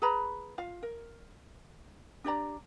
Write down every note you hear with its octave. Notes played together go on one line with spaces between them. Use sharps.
G#4 B4 A#5 B5
F4 F5
A#4
D4 G4 D5 A#5